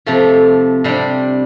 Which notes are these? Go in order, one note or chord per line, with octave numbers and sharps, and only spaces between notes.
C3 F3 A3
C3 G3 D4